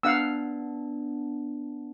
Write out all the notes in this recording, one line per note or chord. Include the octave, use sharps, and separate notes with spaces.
B3 D4 F5 F#5 E6